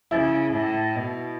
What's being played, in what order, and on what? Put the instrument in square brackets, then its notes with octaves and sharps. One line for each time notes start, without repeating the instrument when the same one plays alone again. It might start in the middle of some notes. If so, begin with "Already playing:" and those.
[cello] C#3 [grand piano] E4
[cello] A2
B2